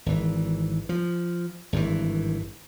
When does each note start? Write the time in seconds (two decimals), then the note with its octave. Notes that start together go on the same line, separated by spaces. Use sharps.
0.06 G#1 E3
0.89 F3
1.73 G#1 G2 C#3 E3